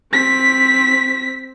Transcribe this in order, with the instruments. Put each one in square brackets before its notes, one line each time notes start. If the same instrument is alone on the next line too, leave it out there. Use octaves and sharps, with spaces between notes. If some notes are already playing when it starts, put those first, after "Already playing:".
[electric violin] C4 B6